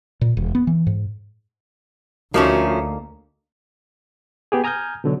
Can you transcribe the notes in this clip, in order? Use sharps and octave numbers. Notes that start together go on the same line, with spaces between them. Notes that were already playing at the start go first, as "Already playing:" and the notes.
A#2
E1
B3
E3
G#2
D2 F3 A3 A#3 C#4 D#4 F#4
B3 G4 G#4
G#5 A#5 D#6 F6 G6 G#6
B2 D3 F#3